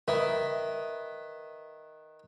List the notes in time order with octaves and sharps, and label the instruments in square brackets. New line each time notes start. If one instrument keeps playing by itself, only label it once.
[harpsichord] D#3 [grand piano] B4 E5